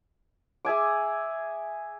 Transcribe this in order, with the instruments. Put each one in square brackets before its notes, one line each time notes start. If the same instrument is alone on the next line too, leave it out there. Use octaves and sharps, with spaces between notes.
[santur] G#4 E5 G#5 D6